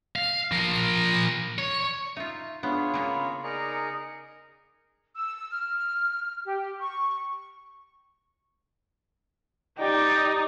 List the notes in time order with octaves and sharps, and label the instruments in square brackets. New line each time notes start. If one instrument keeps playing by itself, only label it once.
[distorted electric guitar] F5
F3 A#4
C#5
[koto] D#4 F4 [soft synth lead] E5
[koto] B3 [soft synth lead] D4 [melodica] F4 G#4 C#5
[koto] C#3 A#3 B3 [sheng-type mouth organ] A#5 [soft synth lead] B5
[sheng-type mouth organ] D#4 G#4 A#4 [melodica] D5 A#5 [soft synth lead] C#7
[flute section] E6
F6
G4
C#6
[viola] D#4 [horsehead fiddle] G4 [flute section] D5 D#5